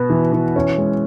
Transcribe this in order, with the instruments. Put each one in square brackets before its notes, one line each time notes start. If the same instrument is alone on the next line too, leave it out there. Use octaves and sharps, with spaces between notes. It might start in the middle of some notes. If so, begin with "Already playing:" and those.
Already playing: [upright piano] B2 B3 F#4
E3
E3
C#4
G#3